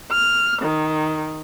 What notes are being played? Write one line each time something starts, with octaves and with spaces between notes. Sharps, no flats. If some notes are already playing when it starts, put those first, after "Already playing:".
F6
D#3